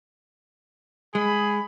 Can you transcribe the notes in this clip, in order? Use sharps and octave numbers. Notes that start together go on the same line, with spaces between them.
G#3 G#4 B5